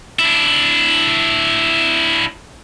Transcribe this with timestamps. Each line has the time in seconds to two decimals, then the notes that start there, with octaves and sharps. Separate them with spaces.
0.19 D4 E4